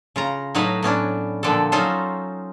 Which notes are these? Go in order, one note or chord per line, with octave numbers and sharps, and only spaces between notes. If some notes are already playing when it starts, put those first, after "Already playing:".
C#3 F4 A#5
A2 F#3 D#4 F#4 B4 F5
A2 B3 C#4 D4
A#2 D3 F3 D4 A4
F#3 C#4 D#4 F4 A4 C5